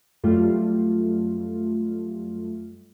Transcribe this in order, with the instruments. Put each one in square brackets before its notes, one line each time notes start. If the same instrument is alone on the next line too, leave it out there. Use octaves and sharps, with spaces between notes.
[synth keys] F#2 G3 A3 F4